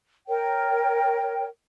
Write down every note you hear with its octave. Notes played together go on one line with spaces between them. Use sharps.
A#4 C#5 G5